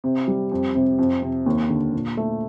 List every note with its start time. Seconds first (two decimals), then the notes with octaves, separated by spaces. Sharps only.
0.04 C3
0.28 G3
0.51 F2
0.75 C3
0.99 F2
1.22 C3
1.46 D#2
1.69 D3
1.93 A#2
2.17 A3